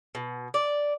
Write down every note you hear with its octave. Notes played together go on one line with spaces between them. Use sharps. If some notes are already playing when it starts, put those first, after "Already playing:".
B2
D5